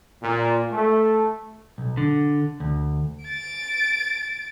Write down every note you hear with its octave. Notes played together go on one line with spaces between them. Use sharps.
A#2
A3
B1
D3
D2
A6 D7